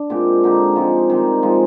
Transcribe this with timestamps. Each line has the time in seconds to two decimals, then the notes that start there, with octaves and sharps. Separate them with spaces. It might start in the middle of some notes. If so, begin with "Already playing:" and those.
Already playing: D4
0.10 A#2 G#3 C4 G4
0.44 D3 G#3 D#4 G4
0.76 F3 G#3 C4 G4
1.10 D#3 G3 C4 G4
1.42 F3 G#3